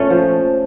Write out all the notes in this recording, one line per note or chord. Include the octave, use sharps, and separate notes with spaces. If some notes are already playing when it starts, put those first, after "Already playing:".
Already playing: A#2 A3 C#4
F3